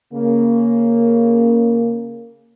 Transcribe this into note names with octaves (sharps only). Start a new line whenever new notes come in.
C#3 A#3